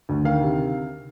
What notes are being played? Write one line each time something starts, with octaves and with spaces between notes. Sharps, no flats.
D2
D#3 F5
C3